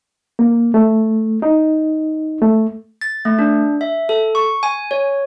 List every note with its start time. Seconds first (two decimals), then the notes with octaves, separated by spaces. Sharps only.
0.39 A#3
0.74 A3
1.42 D#4
2.42 A3
3.01 A6
3.25 A3
3.39 D4
3.81 E5
4.09 A4
4.35 C#6
4.63 G#5
4.91 C#5